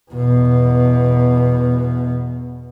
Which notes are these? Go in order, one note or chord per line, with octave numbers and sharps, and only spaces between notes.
E2 B2